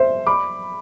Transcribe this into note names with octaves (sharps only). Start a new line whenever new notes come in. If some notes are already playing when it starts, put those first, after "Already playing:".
Already playing: C5 E5
B5 D6